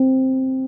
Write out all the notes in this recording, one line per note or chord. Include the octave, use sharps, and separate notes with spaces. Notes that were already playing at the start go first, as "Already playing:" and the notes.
Already playing: C4